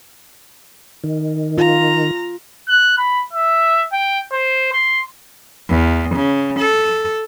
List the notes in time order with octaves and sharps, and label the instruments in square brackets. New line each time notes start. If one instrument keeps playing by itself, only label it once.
[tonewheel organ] D#3
[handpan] F4 [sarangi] A#5
[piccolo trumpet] F#6
B5
E5
G5
C5
C6
[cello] E2
C#3
A4